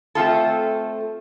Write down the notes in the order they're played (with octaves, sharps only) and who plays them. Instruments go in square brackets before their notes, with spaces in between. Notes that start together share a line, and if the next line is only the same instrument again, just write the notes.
[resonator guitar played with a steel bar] A3 C4 F4 A4